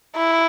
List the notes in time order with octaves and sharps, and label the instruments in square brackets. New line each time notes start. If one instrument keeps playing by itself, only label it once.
[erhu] E4